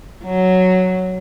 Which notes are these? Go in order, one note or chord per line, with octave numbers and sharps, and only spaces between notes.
F#3